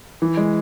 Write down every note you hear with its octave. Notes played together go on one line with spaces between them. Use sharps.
E3
G#3